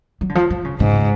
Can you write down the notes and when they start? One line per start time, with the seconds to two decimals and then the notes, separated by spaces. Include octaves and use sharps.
0.21 F#3
0.29 D3
0.35 F3
0.50 F3
0.64 C#3
0.80 G#2 C#3